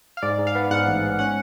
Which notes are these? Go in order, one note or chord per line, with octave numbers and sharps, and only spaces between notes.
F5
G#2 D5
G#2
F5
B3
G#2 F#5
A1
G#2
C#4 F#5